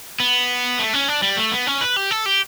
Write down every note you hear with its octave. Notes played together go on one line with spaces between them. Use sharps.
B3
A3
C#4
D4
G3
A3
B3
C#4
B4
G4
A4
G4